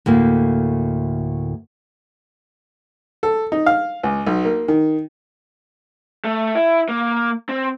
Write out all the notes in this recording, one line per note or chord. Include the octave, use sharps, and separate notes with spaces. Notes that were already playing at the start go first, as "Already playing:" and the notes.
D2 A2 A#3
A4
D#4
F5
C#2
B1
A#3
D#3
A3
E4
A#3
C4